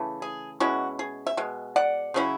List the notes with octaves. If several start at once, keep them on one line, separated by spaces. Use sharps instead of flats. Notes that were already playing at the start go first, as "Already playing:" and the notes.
Already playing: C#3 E3 A3
G#4
B2 G#3 C#4 E4 F#4
G#4
E5
B2 G#3
D5 F#5
C#3 F#3 C#4 E4